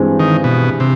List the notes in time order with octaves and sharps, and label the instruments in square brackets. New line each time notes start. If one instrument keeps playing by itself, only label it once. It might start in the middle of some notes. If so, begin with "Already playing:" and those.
Already playing: [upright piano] G2 E3 G#3 C4
[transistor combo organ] D#3
B2
C3